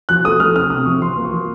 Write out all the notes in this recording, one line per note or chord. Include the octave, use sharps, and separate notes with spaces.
F3 F#6
A3 D#6
A3 F6
C3 F6
C3 D#6
F3 C#6
F3 C6
A#3
C#6
F3